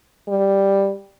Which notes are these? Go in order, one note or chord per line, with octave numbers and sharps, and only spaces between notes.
G3